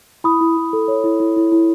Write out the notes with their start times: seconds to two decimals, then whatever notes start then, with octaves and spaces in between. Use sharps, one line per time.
0.24 E4 B5 D#6
0.41 E4
0.57 E4
0.73 A4
0.88 C#5
1.04 E4
1.20 E4
1.36 E4
1.52 E4